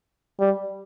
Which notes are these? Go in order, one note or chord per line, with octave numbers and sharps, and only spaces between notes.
G3